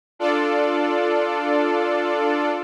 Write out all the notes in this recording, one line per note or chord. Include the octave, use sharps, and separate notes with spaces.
D4 F4 A4 D5